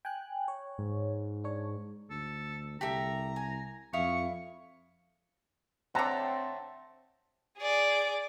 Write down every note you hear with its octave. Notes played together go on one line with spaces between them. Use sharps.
G5 G#5 F#6
C#5
G#2
D4 C#5
D2 A4
C2 G4 A4 E5 A#5
G#5
F2 E4 F5 C#6 D#6
D3 A3 C4 C#5 F#5 A5 A#5 C6
G#4 D5